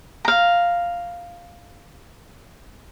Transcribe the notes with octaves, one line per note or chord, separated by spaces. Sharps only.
F5 A#5